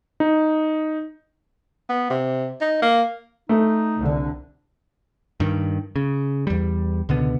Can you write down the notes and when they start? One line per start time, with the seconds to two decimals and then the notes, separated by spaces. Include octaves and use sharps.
0.20 D#4
1.89 B3
2.10 C3
2.61 D#4
2.82 A#3
3.49 A3 D#4
3.98 C2 D3
5.40 G2 D#3
5.96 C#3
6.47 E2 G3
7.09 C#2 B2 D3 B3